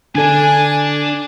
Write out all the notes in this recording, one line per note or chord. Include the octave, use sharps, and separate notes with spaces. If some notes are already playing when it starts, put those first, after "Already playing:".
D3 D4 A4 D5 G#5